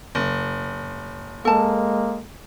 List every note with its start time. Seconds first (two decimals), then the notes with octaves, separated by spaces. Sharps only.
0.15 F#1
1.45 G#3 A#3 A4 A5